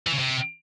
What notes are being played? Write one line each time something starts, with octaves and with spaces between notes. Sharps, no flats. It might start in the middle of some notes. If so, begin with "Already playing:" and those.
E3
C#3
C3